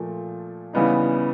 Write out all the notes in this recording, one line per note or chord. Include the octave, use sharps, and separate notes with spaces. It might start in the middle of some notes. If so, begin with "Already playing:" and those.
Already playing: A#2 F3 A3
C#3 E3 G3 B3 D#4